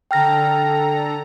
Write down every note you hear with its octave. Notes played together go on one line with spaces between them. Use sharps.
D3 A4 G5 A#5 F6 A#6